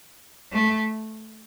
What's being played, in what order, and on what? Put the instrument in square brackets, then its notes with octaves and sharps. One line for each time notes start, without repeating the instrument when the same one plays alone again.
[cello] A3